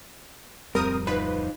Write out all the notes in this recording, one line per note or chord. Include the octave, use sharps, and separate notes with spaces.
D1 F2 G3 C4 A#4 D#6
D#4 F4 B4 C5